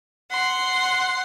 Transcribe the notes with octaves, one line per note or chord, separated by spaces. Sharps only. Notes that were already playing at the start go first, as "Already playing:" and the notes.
F#5 C6